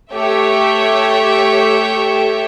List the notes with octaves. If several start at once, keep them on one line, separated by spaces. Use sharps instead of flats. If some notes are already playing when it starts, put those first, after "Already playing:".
A3 G4 C#5 E5 G5